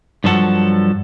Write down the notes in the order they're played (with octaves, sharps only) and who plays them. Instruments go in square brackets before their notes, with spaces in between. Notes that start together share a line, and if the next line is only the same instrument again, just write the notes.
[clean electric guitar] G2 F3 F#3 A4 F#5